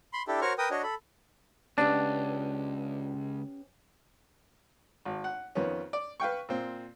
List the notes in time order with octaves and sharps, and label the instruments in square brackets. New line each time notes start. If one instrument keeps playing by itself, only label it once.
[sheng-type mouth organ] B5 C6
D4 E4 G4 A4
F#4 A#4 C5 C#5 C#6 F6
A#4 B4 G5 D#6
D4 F#4 C#5 D#5
A4 B5
[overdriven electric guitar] C#2 [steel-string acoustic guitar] B3 C#4 G4 [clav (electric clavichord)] D4
[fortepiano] G#1
F#5
F2 D#3 B3 C#4
D5
B4 F5 G5 C#6
A#2 C4